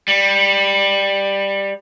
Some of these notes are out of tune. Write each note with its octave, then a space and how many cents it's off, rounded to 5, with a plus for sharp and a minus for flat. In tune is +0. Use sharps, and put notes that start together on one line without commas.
G3 +10